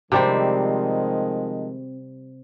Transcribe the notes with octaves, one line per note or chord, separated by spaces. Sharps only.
C3 D#3 F3 G3 G#3 C4